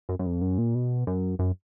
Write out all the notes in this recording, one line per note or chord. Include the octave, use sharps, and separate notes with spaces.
F#2
F#2
F2
F#2
A#2
B2
F#2
F#2